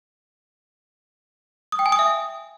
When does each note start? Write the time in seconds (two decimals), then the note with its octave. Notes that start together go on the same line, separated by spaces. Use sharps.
1.72 D#6
1.79 G5
1.86 G#5
1.92 D#6
1.99 E5